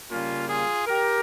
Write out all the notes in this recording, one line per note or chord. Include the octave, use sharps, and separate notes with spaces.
C#3 G3 A#3 C#4 F4
F4 G#4
G4 A#4